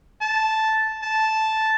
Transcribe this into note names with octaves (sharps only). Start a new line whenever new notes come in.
A5
A5